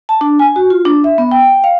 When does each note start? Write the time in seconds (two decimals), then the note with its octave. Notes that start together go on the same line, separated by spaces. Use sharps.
0.09 A5
0.21 D4
0.39 G#5
0.56 F#4
0.70 F4
0.85 D4
1.04 E5
1.18 B3
1.31 G5
1.64 F5